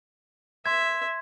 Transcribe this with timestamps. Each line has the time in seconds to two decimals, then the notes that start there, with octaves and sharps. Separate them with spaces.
0.66 E5 C6 G#6